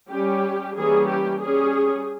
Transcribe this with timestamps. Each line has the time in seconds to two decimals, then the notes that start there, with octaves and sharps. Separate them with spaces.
0.09 G3 C#4 G4
0.75 E3 G3 A#3 C#4 G#4
1.08 G4
1.40 G3 C#4 G#4